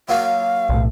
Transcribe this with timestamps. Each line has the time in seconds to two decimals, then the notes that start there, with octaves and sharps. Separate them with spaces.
0.09 F#3 A#3 F#4 F5
0.69 B1 A2